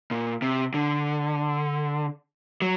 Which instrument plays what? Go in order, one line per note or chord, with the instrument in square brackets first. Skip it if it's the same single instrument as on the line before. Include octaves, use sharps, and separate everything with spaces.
[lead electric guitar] A#2
C3
D3
F#3